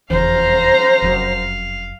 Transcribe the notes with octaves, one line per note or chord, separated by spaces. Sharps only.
F1 E2 C5 F5 A#5
F1 F#2